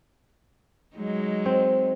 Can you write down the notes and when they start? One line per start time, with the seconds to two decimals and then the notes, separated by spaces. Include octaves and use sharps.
0.96 F#3 G#3 D#4
1.46 C4